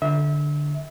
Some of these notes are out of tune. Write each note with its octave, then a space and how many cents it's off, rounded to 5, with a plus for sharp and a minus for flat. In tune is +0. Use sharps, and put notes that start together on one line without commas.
D3 +0 E5 -30